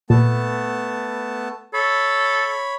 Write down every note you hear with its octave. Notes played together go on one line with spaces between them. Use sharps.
A#2 A3 B3 A5
A4 C#5 B5